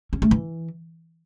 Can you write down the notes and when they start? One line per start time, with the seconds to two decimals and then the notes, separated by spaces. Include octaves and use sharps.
0.13 C#4
0.22 A3
0.31 E3